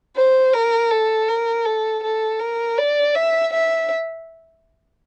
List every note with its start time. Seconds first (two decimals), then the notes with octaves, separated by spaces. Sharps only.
0.16 C5
0.53 A#4
0.91 A4
1.28 A#4
1.65 A4
2.03 A4
2.40 A#4
2.78 D5
3.15 E5
3.53 E5